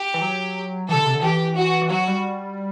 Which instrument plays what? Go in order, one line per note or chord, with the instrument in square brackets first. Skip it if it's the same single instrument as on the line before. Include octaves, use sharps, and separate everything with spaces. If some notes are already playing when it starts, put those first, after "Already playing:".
Already playing: [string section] G4
[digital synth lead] E3
F#3
[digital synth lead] C3 E3 [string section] A4
[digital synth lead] D3
C3
D3
[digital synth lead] E3 [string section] G4
[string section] F#4
[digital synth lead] E3
[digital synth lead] F#3 [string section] F#4
[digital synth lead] G3